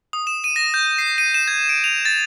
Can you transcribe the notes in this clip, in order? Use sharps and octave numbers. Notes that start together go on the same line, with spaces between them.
D#6
E7
D#7
A#6
G6
C7
D#7
E7
G#6
D7
F7
A6